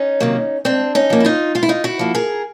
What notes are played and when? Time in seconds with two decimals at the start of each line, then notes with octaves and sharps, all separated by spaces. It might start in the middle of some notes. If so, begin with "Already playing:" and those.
Already playing: C#4 D#4
0.20 C3 D#3 F#3 A#3
0.65 G#2 C4 D4
0.95 C#4 D#4
1.10 F3 A#3
1.20 E4
1.25 D#4 F4
1.55 G#2 F4
1.63 E4
1.69 D#4 F4
1.84 E4 F#4
1.99 F3 A#3
2.15 G#4 A#4